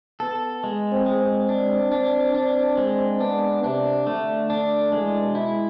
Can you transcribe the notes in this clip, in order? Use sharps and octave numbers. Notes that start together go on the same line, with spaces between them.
B3 A4
G#3
C4
G#3
C4
D4
D4
D4
G#3
B3 D4
C3 D4
D3 A3
D4
E3 G#3
B2
E4